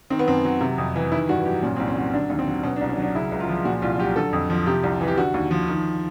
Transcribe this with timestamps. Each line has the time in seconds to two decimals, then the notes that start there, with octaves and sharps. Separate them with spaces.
0.10 D#3 C4
0.19 B3
0.28 F#2 C4
0.45 F#3
0.61 C3
0.78 F2
0.96 E3
1.12 D#3 E4
1.29 G2 F#4
1.46 F#3 G4
1.63 A#2 C#4
1.76 C2 C4
1.88 C#4
1.96 F#3
2.14 D3 D4
2.30 D#2
2.39 C4
2.47 F#3
2.63 B2 C#4
2.76 D4
2.81 C2
2.89 C#4
2.98 F#3 D4
3.15 C#3 E4
3.32 C#2
3.40 F4
3.49 F3
3.65 A#2 F#4
3.82 C2 F4
3.99 F#3 G4
4.16 D3 A4
4.33 F2
4.50 F3
4.66 C3 G4
4.83 C2
5.01 E3
5.08 G4
5.18 D3 F#4
5.34 D#2
5.51 F3
5.68 D#3